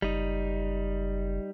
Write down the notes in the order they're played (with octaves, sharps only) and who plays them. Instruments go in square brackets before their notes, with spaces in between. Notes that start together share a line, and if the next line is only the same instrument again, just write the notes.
[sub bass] F#1 [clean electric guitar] G3 D#4